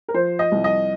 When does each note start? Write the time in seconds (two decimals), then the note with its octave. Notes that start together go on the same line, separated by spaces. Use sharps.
0.08 A#4
0.14 F3 C5
0.39 D#5
0.52 C2
0.64 D#5